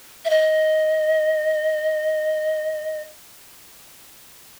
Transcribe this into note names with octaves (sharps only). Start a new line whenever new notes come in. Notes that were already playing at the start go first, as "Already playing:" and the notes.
E5
D#5